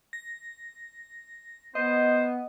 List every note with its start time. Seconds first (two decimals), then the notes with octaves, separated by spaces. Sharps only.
0.13 A#6
1.75 B3 C5 D#5